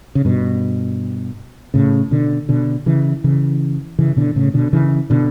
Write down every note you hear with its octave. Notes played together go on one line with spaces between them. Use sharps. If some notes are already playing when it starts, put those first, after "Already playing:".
C#3
G2 B2
A2 C#3
B2 D3
B2 D3
C#3 E3
C#3 E3
C#3 E3
B2 D3
A2 C#3
B2 D3
C#3 E3
B2 D3